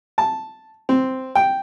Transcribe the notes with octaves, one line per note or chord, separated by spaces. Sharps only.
A5
C4
G5